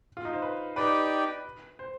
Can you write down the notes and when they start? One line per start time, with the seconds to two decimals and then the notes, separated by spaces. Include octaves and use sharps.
0.17 F4
0.25 D#4
0.33 C5
0.42 B4
0.76 D#4 G4 B4 D5 G5
1.79 C5